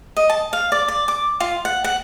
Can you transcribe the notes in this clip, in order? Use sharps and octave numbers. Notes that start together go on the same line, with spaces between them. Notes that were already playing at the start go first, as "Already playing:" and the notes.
D#5
A5
F5
D5
D5
D6
F4
F#5
F#5